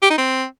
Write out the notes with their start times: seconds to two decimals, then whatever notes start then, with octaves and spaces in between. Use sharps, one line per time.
0.02 G4
0.10 D#4
0.18 C4